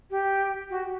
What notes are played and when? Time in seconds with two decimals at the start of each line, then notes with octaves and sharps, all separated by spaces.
0.10 G4
0.70 F#4